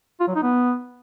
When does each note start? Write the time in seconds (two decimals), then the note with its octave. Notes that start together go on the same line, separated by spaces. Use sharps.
0.20 F4
0.28 F#3
0.36 D#4
0.43 B3